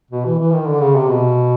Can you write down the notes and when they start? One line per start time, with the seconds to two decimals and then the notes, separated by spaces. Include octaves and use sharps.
0.11 B2
0.26 E3
0.40 E3
0.52 D#3
0.68 D3
0.81 C#3
0.96 C3
1.10 B2